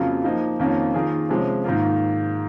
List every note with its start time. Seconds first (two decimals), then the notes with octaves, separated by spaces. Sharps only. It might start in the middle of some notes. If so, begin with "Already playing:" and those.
Already playing: F2 C#3 F#3 A#3 F4
0.24 F3 A#3 D#4
0.59 F2 D#3 A#3 C#4 F4
0.94 D#3 A#3 F4 G#4
1.29 C3 F3 G#3 C#4
1.64 G#2 D#3 A#3 F4